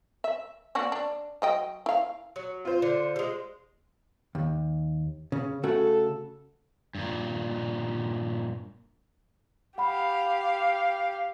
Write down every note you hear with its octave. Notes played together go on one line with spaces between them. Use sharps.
E5
A#3 D4 F#4
D4
F#3 D#5 G5
E4 F5
F#3
F4 C5
D3
G3 G#3
D#2
C#3
C#3 A3 F#4 A4
G2 A#2
G4 F5 F#5 B5